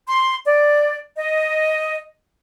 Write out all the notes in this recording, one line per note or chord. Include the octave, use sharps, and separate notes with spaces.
C6
D5
D#5